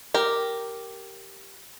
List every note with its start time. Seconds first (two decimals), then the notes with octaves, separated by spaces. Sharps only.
0.14 G4 A#4